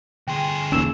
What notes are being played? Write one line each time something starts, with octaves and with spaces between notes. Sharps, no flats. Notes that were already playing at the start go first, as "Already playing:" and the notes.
D2 G#4 G5 C6
E2 A#3 C#4 D#4 E6 E7